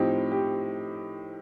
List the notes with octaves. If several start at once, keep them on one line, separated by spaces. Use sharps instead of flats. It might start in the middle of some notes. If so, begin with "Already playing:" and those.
Already playing: A2 F3 C4 D#4 G4
G4